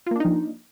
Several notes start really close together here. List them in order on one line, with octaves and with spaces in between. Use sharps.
F4 A#3 D4 D#4 F3